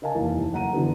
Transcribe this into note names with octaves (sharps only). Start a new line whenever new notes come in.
A#4 D#5 F5 G#5 A5
F1 D#2 E3
F#1 F#5 A#5 D#7
D3 E3 B3